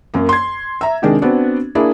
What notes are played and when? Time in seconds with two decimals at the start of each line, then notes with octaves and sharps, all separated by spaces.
0.14 F#2 A#3
0.29 C6 G#6
0.81 E5 A#5
1.02 C3 D#3 G#3 D4
1.22 B3 C4 D4 F#4
1.75 A#3 D4 E4 G#4